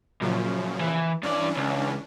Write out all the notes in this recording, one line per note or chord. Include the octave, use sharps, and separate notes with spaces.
F#2 A#2 C#3 F3
E3
G2 E3 C#4 D4 D5
C#2